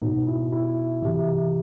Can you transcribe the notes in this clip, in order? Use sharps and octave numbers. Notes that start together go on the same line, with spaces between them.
B2 D#4
E4
E4
C3 E3